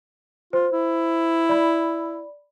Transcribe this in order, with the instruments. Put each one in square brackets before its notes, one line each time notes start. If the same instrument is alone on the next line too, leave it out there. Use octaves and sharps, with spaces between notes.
[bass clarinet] F4 [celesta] C5
[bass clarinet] E4
[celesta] D5 B5